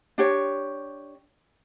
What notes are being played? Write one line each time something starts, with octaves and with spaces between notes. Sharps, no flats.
D4 G4 C#5